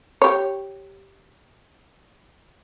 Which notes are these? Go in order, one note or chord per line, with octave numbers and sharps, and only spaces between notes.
G4 C#5